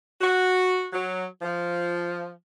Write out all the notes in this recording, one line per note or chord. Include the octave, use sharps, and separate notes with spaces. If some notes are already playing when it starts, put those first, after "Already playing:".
F#4
F#3
F3